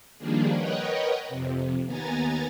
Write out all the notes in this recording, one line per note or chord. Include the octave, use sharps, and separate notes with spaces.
D#3 F3 G3 A#3 D4 G#4
A#4 B4 C#5 D#5 F#5 G5
F2 C3
D#2 B3 G#5 A#5 A6